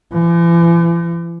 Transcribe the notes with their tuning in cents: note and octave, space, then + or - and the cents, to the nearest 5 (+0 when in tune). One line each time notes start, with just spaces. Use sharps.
E3 +45